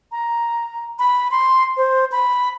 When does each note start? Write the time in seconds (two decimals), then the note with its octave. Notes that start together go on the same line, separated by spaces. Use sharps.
0.12 A#5
0.99 B5
1.31 C6
1.77 C5
2.12 B5